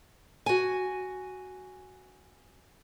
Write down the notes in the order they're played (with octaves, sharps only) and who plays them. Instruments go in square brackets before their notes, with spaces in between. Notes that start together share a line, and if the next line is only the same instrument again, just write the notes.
[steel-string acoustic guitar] F#4 G#5